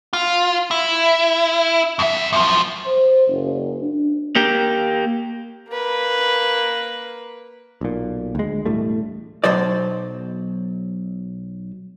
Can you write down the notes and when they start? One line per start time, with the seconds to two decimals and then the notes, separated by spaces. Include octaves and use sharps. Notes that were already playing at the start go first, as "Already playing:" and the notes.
0.13 F4
0.71 E4
1.99 F2 E5
2.33 F#2 F3
2.85 C5
3.28 F#1
3.81 D4
4.36 A#3 G4
5.69 A#3 B4
7.81 B1 A#2
8.35 D2 G#3
8.66 E1 A2 G3 A3
9.44 B1 B2 F#3 C5 D5